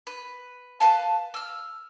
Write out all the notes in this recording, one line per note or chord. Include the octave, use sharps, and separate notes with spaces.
B4
B4 D#5 F5 A5
E6 F6